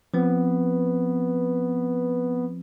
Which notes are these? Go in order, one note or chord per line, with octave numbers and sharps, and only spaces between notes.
F3 B3 C4